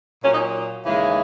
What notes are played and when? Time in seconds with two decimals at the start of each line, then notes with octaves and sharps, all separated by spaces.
0.23 A#2 F#3 C#4
0.33 D#4
0.85 D#2 C#3 E3 G#3